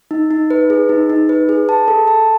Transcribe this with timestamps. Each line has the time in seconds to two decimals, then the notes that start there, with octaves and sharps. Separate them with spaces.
0.11 D#4
0.31 D#4
0.51 B4
0.70 G#4
0.89 D#4
1.10 D#4
1.29 B4
1.49 G#4
1.69 A5
1.88 A4
2.07 A5